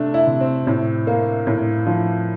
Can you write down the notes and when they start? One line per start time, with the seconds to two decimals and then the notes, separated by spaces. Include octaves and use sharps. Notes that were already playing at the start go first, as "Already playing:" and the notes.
Already playing: C3 A3 D4
0.14 E4
0.27 C3
0.41 C4
0.67 A2
1.07 A#3
1.47 A2
1.86 F3